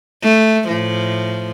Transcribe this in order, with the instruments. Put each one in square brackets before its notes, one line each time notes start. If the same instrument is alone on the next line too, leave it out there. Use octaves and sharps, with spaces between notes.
[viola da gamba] A3
A2 F3